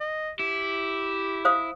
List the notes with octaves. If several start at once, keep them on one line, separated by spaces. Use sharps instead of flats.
D#5
E4 G4
C5 F5 D#6